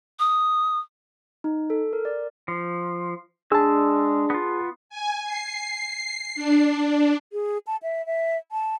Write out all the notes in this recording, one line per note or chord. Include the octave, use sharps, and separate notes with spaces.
D#6
D#4
A4
A#4
D5
F3
G#3 D4 G#4 A5 E6
B3 F4
G#5
C7
D4
G#4
A5
E5
E5
A5